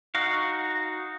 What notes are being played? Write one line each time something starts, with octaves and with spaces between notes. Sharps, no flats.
D#4 F#4 F5